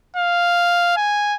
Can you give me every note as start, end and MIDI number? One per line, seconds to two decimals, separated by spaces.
0.16 0.93 77
0.97 1.36 80